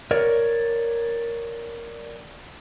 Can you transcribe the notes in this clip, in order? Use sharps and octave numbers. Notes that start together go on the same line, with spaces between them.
A#4 C#5 D5